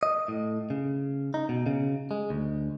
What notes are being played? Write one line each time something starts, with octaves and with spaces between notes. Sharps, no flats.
D#5
A2
C#3
D#4
B2
C#3
G#3
D2